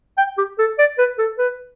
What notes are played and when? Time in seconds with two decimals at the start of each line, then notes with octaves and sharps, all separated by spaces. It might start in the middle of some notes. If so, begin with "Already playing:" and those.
0.18 G5
0.38 G4
0.59 A4
0.79 D5
0.98 B4
1.19 A4
1.38 B4